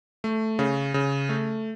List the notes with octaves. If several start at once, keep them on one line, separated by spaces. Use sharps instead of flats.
A3
C#3
C#3
A3